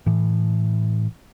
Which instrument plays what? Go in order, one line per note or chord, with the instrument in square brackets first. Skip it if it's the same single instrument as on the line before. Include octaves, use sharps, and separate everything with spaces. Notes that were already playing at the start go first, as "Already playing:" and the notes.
[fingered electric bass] A2 E3